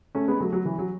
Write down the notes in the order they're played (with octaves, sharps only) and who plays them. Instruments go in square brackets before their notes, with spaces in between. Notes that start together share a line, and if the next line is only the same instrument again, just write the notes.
[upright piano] A3 C#4
G#3 B3
F#3 A3
F#3
E3
F#3